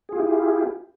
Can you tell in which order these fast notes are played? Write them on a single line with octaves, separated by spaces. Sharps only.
G#4 F4 G4 E4